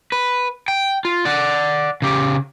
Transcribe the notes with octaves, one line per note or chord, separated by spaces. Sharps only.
B4
G5
F4
D5 F#5
C#3 G4